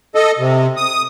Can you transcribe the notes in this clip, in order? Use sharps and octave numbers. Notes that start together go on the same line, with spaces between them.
A4 D#5
C3
D#6